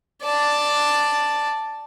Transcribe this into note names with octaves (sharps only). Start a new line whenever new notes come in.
D5 A5